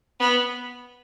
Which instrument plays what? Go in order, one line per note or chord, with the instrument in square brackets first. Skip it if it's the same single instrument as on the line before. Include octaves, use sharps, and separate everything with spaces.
[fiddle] B3